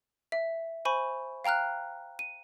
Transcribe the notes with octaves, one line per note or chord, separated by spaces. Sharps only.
E5
C5 G#5 B5 C#6
F5 G5 A#5 F6 F#6
D#7